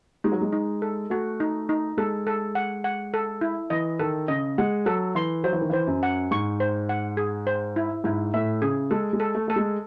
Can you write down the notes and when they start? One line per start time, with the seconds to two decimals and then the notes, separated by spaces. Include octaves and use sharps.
0.24 G#3 D#4
0.32 F#3
0.41 G#3
0.53 D#4
0.82 A4
1.10 A3 F#4
1.40 D#4
1.69 D#4
1.97 G#3 A4
2.27 A4
2.55 F#5
2.84 F#5
3.14 A4
3.41 E4
3.70 E3 D#5
3.99 D#3 A4
4.28 C#3 D#5
4.58 G#3 F#5
4.86 F#3 A4
5.15 E3 C6
5.44 F#3 C5
5.53 E3
5.61 D#3
5.70 E3 C5
5.87 F#2
6.03 F#5
6.31 G#2 C#6
6.60 C5
6.89 F#5
7.17 G#4
7.47 C5
7.76 E4
8.04 G#2 E4
8.34 A2 E5
8.62 C#3 G#4
8.91 G#3 A4
9.13 G#3
9.20 A4
9.35 A3
9.48 A3 A4
9.56 G#3